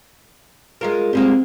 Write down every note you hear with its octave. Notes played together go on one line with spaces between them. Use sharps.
G#3 F4 A#4
G3 G#3 A#3 C4